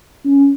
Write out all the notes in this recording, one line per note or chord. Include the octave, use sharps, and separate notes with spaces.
C#4